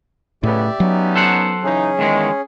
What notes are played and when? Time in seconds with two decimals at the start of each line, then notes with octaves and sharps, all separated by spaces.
0.43 B1 A2 C#3 B3 G4 D5 E5
0.80 F#3 B3 C#4 D#4
1.16 A4 C5 F#5
1.63 C#3 E3 C#4 D#4 G#4
1.99 E2 D#3 G#3